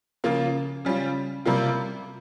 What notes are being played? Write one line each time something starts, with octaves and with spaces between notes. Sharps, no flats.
C#3 F3 A#3 F4
C#3 G3 C#4 F4
C3 G3 A#3 F4